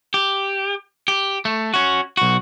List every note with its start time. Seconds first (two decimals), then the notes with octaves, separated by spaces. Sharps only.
0.14 G4
1.08 G4
1.45 A3
1.74 C#4 F#4
2.17 B1 F#4